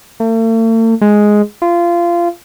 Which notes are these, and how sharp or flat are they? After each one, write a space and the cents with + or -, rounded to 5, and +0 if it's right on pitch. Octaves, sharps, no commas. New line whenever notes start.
A3 +45
G#3 +5
F4 -20